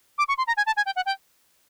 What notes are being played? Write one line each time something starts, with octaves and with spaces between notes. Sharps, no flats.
D6
C#6
C6
A#5
G#5
A5
G#5
G5
F#5
G5